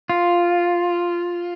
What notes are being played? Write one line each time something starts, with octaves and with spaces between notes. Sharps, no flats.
F4